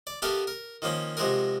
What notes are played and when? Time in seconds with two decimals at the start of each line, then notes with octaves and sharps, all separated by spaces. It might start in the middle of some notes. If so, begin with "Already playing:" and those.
0.07 D5
0.22 B3 G4 A4 A#4 E5 F5
0.47 A#4
0.82 D#3 F3 A#3 C#4
1.17 C3 F3 G#3 F#4 G#4 A#4